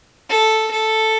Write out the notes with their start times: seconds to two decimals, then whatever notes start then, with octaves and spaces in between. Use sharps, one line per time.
0.29 A4
0.71 A4